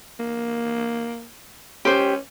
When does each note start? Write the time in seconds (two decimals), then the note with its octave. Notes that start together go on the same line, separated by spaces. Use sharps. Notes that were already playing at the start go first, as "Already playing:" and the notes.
0.19 A#3
1.85 C#4 G4 C5